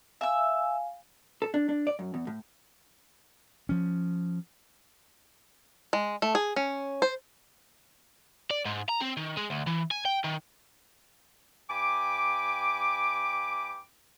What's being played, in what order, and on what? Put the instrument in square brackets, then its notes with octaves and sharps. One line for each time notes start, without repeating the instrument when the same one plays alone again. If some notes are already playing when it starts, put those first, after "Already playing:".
[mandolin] E5 E6 [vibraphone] F5 G#5
[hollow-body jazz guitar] A4
D4
D4
D5
F#2
E2
A2
[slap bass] F3 C#4
[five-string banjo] G#3
A3
G#4
C#4
C5
[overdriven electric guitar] D5
G#2
A#5
C4
D#3
G#3
D2
E3
G#5
G5
D#3
[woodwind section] G2 G5 G#5 B5 D6